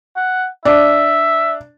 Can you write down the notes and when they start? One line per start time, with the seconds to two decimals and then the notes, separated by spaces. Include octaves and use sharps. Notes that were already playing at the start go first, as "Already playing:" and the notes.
0.16 F#5
0.65 D4 E5